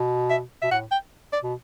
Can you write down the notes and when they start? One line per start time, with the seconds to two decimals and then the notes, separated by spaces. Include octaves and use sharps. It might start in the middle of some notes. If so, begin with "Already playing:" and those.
Already playing: B2
0.30 E5
0.62 B2 E5
0.71 A2 F#5
0.91 G5
1.32 D5
1.43 B2